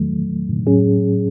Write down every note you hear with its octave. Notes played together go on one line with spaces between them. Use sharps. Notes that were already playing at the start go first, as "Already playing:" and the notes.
Already playing: E2 D#3 F#3 A3
A2 F#3 C#4 G#4